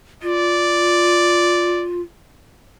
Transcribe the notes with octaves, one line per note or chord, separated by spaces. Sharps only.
F4 D5